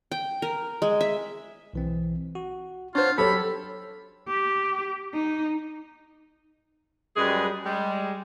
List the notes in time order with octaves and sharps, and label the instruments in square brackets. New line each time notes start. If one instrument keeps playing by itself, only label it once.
[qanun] G5
A#4
G#3
E5
[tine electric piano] B1 E3 C4
F#4
[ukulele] D4 C5 [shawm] F4 [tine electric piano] C#5 F#5 C6
[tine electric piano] F#3 [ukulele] G4 C#5 [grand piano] A4 [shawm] B5
[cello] G4
D#4
[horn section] F#2 G3 G#3 G#4 B4 D#5
G3 G#3